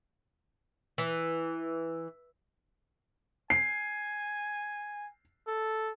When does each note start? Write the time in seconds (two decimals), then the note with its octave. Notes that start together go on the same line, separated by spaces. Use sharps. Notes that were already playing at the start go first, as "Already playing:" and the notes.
0.98 E3
3.50 G#5 C7
5.47 A4